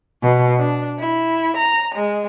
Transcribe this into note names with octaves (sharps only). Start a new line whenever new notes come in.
B2
D4
E4
A#5
G#3